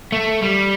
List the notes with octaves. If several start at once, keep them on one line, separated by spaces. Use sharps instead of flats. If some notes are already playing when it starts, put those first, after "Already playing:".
A3
G3